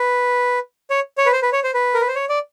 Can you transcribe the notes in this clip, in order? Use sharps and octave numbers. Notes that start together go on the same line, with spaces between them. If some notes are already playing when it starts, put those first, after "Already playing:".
Already playing: B4
C#5
C#5
B4
C5
B4
C#5
C5
B4
A#4
B4
C5
C#5
D5